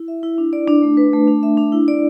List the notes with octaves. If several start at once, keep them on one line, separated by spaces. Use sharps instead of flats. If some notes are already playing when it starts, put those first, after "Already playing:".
Already playing: E4
E5
E4
D4
D5
D4
A3
B4
A3
D4
E5
D4
E4
D5